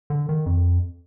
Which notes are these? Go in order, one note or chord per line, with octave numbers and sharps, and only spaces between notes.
D3
D#3
F2